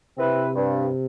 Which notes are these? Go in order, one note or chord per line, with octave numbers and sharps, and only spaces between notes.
C3 C4 E4 B4
G2